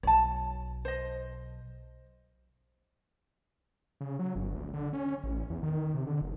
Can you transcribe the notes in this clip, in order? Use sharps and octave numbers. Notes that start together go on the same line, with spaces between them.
B1 C#5 A5
C5 D#5
C#3
F#3
G1
D2
D3
C#4
A1
E2
D#3
C3
D3
F#1